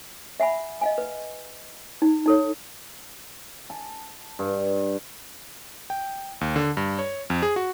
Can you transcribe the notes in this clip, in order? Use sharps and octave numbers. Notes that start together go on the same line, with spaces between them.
E5 F#5 G#5 B5
D#5 F5 G#5
B4
D#4
D#4 A4 C#5
A5
G2
G5
D#2
D3
G2
C#5
F2
G#4
F#4